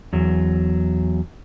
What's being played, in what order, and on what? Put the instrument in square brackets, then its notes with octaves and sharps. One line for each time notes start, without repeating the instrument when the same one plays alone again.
[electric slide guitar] E2 F#3